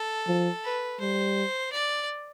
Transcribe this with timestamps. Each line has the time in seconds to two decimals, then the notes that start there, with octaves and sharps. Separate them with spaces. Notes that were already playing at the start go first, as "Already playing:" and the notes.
Already playing: A4
0.27 F3
0.64 B4
1.00 G3 C5
1.72 D5